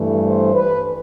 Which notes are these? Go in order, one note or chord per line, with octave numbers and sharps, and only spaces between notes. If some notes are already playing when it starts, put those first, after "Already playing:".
Already playing: G2 E3 A3
C5
B4